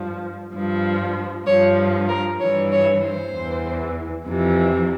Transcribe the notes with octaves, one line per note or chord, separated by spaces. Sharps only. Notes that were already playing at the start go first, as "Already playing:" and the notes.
Already playing: G2 F3
G2 F3
G2 F3 C#5
A#4
G2 E3 C#5
C#5
C5
E2 E3
F2 C3 E3